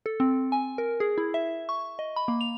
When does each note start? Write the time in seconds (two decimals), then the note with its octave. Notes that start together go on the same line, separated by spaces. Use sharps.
0.06 A4
0.20 C4
0.52 G#5
0.78 A#4
1.00 G#4
1.18 E4
1.34 E5
1.69 C#6
1.99 D#5
2.16 B5
2.28 A#3
2.41 F7